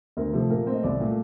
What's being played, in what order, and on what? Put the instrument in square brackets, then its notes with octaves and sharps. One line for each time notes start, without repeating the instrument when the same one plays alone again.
[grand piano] D2 A#4
C3 F3 A3 A4
A#2 A#4
A3 C4
D#5
C2 D5
A#2 A3